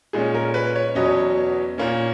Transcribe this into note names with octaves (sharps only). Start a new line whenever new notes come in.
A#2 G#3 C#4 G#4
A#4
B4
C#5
E2 B2 F#3 C#4 D#5
A#2 A#3 C#4